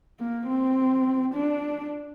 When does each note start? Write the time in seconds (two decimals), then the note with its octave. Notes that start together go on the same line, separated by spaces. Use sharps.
0.19 A#3
0.48 C4
1.34 D4